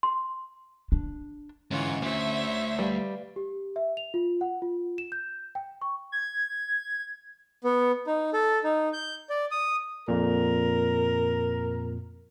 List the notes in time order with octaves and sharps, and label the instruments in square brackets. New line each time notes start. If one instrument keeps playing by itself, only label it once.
[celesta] C6
[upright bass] D4
[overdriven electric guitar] G#2 [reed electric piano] D3 C#4 [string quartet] E3 F4 C#5
[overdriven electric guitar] D2 [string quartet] C5 C#5 E5
[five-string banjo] G3 [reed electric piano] B4 D5 F5
[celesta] G4
E5
F7
F4
F#5
F4
E7
G6
G5
C#6
[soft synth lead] G#6
[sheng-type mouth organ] B3
D#4
A4
D#4
G6
D5
D#6
[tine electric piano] F2 A#2 [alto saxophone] A#4